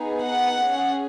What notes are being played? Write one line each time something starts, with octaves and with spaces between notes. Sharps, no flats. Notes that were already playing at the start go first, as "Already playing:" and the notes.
Already playing: B3 D#4 G#4
F#5
C#4 G#4